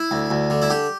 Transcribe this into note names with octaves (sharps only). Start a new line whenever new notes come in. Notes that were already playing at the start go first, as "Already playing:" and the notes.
Already playing: E4
D2
D2
D3
E4
D3 G4